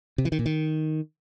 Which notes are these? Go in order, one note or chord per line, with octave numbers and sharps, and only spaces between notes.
C3
E3
D#3
A#2
D#3